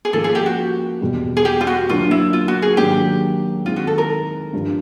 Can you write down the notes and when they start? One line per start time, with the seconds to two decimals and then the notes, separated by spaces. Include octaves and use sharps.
0.05 G#4
0.13 G#2 F3 A#3 C#4 A4
0.24 G#4
0.35 G4
0.46 F#4
1.01 E2 B2 G3
1.37 G#4
1.45 G4
1.61 F4
1.67 F#4
1.89 D3 F#3 A#3 D4 F4
2.11 E4
2.33 F4
2.48 F#4
2.62 G#4
2.77 G#2 D#3 F#3 A#3 D4 G4
3.65 D#3 G#3 C4 E4 F4
3.76 F#4
3.87 A4
3.98 A#4
4.53 G2 D3 F3